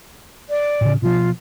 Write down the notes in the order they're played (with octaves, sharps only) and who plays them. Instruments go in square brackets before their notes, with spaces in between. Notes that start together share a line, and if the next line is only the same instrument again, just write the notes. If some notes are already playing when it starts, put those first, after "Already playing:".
[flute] D5
[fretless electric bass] A2 C#3
[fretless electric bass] B2 F3 [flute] F4